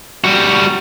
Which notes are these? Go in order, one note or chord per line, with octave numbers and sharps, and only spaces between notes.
G3 F#4